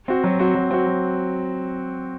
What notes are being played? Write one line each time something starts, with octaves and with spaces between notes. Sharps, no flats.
C4 F#4
F#3
C4 F#4
F#3
C4 F#4
F#3